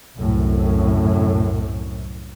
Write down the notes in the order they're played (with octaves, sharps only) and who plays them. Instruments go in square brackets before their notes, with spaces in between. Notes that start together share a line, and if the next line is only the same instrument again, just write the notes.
[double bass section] C2 F#2 A2